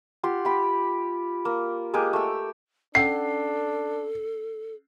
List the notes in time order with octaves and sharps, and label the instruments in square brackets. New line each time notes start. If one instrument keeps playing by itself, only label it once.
[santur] F4 G4 F#5 C6
G4 B5
A#3
G#3 A#3 G4 G#4
A3 E6
[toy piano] C#4 F#5 E6 [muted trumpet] D4 [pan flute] A4 [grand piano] C7